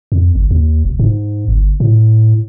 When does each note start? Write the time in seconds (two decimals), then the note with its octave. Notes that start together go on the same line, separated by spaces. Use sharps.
0.12 F2
0.35 G1
0.51 D#2
0.85 E1
0.99 G#2
1.48 G1
1.80 A2